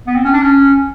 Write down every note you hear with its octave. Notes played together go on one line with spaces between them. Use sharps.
B3
C4
C#4
D4
C#4